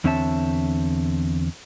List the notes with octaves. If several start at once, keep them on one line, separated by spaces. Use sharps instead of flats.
E2 D3 C4 C#5 E5 A5